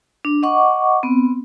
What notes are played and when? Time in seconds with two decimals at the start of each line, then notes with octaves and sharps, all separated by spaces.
0.25 D4
0.43 D#5 F#5 C#6 D6
1.03 B3 C4